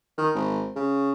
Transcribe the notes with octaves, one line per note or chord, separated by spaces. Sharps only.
D#3
G#1
C#3